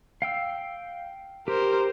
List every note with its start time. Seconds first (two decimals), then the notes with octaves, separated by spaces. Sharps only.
0.22 F5 G5 E6
1.48 G4 A#4 C5